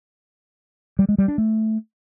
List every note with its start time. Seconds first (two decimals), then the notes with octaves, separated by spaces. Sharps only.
0.99 G3
1.09 G#3
1.18 G3
1.28 D4
1.38 A3